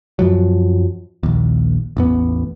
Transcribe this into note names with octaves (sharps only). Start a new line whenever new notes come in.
F#2 F3 F#3
A#1 D#2
A1 E2 B3